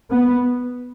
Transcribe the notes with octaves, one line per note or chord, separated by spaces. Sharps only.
B3